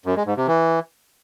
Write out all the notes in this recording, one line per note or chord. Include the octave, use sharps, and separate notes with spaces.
F#2
G#3
G#2
C3
E3